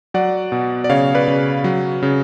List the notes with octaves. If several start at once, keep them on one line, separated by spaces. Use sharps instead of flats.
F#3 D5 F#5
B2
D5
C#3 C#5 F5
B4 D5
C#3
F#3
C#3